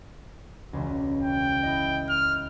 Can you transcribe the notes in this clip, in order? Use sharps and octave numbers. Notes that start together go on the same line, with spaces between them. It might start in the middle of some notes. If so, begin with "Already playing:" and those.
E1 C#2
G5
E4 D#5
F6